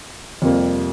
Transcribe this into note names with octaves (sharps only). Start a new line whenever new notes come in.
F2 C3 G3 A#3